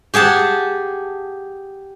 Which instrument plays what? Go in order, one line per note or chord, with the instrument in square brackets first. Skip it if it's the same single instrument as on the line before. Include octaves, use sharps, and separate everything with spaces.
[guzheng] G4 G#4 F#5 A5